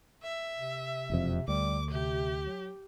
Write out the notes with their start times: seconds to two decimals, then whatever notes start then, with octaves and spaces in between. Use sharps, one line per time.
0.23 E5
0.57 C3
1.10 E1 F2
1.48 D2 G3 D6
1.90 C3 G4
2.46 F#3